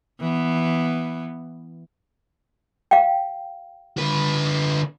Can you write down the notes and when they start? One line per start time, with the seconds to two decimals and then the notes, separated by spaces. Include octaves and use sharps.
0.21 E3 B3
2.91 F5 G5
3.98 D3 B4